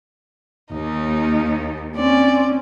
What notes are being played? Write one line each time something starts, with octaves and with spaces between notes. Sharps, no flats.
D#2 D#4
C4 C#4 D5